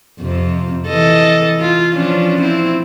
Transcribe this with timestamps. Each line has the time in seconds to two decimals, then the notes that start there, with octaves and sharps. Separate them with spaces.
0.20 F2 C3
0.88 E3 A4 D#5
1.60 F4
1.95 F3 C#4 D4
2.40 C4 E4